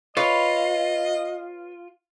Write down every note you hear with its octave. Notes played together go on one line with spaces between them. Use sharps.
F4 B4 C#5 D#5